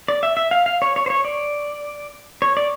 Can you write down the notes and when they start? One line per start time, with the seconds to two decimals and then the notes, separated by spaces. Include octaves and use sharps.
0.08 D5
0.23 E5
0.37 E5
0.51 F5
0.66 F5
0.82 C#5
0.96 C#5
1.06 C5
1.10 C#5
1.25 D5
2.42 C#5
2.57 D5